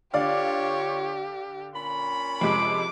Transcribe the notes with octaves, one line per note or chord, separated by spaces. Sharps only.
D3 F4 G4 C#5 D5 F5
A#2 C#4 B5
F2 C3 G#3 D6